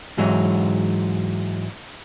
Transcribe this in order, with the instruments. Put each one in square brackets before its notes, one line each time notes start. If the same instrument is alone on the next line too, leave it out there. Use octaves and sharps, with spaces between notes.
[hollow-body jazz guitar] G#2 E3 F#3 G#3